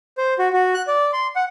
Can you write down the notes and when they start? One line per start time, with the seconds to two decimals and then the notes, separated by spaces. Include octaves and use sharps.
0.18 C5
0.39 F#4
0.53 F#4
0.74 F#6
0.87 D5
1.13 C6
1.36 F#5